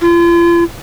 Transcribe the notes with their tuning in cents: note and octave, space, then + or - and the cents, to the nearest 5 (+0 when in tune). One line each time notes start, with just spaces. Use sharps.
F4 -40